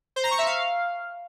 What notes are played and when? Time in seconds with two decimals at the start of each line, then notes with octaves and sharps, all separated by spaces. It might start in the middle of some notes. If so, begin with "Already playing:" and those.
0.16 C5
0.24 A#5
0.31 C#6
0.38 E5
0.46 F5